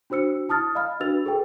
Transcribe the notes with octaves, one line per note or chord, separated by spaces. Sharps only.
D4 F#4 C5 E6 C#7
E4 A5 D#6 F6 A6
D#5 F5 B5 F6
D4 F#4 B4 E6 A6 F7
G#4 A4 B4 G5